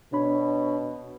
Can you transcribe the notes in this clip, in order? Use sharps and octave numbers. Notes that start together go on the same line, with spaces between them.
B2 D4 C#5 B5